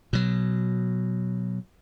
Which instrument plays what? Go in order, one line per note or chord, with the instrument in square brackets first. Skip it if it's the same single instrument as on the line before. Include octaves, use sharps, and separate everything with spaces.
[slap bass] B2 F#3